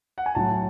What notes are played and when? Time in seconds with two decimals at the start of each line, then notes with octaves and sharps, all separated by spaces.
0.18 F#5
0.26 G#5
0.35 A2 F#3 A5